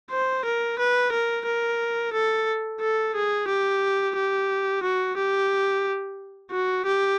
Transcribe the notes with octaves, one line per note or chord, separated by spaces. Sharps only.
C5
A#4
B4
A#4
A#4
A4
A4
G#4
G4
G4
F#4
G4
F#4
G4